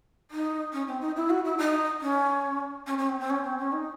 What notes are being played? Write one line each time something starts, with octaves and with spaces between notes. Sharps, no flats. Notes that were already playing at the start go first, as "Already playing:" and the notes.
D#4
C#4
C4
D#4
E4
F#4
E4
D#4
C#4
C#4
C#4
C4
C4
C#4
C4
C#4
D#4